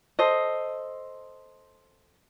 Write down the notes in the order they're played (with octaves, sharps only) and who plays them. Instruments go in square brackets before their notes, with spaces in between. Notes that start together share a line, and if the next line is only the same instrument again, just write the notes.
[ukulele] A4 C5 D#5